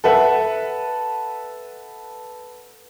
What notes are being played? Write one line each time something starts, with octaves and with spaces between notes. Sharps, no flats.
A4 B4 E5 F#5